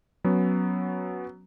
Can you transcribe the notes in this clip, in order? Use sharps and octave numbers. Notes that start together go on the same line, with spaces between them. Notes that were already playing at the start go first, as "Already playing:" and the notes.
F#3 B3 C#4